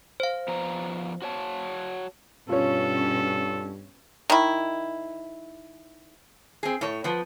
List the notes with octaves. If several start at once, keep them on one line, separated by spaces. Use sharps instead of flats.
C5 F5
F3 B3 A#5
F#4 C#5 A5
G2 B2 C#4 F4 A4 C#5
D#3 E4
C4 G#4
A2 C#5
F3 B3